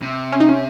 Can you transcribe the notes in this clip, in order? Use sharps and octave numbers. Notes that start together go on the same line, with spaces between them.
C3
C#4
D#4
C#4